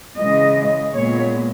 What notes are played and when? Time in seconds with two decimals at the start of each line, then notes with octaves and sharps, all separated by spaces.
0.18 C#3 E3 G#3 D#5
0.93 A#2 G#3 B3 C#5